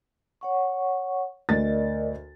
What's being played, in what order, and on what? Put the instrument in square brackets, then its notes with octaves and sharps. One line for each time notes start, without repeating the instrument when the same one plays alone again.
[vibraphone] C#5 F#5 C#6
[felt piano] D2 A6 [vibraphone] A#4 D5 D#5